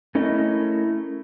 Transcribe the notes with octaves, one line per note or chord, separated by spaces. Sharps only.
A3 C#4 E4 A#4 D#5